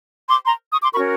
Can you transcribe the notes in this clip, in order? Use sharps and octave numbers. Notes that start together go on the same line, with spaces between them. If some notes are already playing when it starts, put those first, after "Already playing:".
C6 D6
A#5 C6
C#6 D#6
C6 D6
C#4 F#4 A#4 B5 C#6